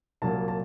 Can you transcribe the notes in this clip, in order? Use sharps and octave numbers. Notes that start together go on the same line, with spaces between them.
C2 A#2 F#3 A#3 A5
A5